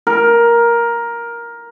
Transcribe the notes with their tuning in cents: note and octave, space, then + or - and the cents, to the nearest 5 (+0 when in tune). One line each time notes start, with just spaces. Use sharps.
A#4 +10